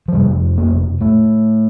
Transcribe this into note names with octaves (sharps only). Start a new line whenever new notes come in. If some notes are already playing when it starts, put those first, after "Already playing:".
F3
F2 C3 G3
A#3
A2 A3